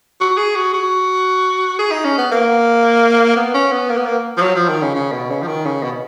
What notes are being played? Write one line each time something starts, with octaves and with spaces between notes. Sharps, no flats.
F#4
G#4
F#4
F#4
G#4
D#4
C#4
B3
A#3
B3
C#4
B3
A#3
B3
A#3
F3
F#3
F3
D#3
C#3
C#3
B2
C#3
F3
D#3
C#3
B2